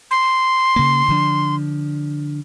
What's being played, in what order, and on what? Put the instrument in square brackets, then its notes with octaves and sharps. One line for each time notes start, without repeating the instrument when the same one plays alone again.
[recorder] C6
[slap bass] C#3 A#3
D3 F3 D4